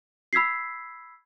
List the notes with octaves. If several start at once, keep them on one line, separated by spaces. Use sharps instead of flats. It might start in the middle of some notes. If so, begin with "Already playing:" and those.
B5 E6 G#6 B6 C7